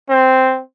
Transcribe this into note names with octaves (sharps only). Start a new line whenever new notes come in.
C4